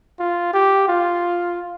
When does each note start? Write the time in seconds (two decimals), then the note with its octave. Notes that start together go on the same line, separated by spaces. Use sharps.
0.20 F4
0.53 G4
0.88 F4